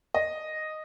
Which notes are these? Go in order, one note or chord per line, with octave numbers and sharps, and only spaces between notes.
D#5